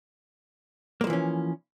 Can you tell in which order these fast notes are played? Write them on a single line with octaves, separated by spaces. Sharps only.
A#3 G#3 F3 E3 C#4